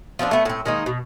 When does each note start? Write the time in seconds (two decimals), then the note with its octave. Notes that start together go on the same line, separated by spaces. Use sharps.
0.19 F3 B3 C4 D4
0.31 A3 B3
0.45 A2 C4
0.65 D#3 G#3 A#3 D#4
0.86 B2